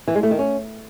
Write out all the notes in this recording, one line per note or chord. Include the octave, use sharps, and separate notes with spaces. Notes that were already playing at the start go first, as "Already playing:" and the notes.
E3
G#3
A3
D#3
C#4